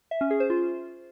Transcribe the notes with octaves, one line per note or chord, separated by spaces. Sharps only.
E5
C#4
G#4
C5
F4